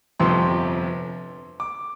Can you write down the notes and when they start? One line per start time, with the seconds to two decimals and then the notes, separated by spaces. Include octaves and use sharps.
0.20 G1 F2 C3 F3 C6
1.60 D6